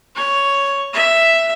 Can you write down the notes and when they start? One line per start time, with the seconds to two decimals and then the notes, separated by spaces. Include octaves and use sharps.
0.16 C#5
0.93 E5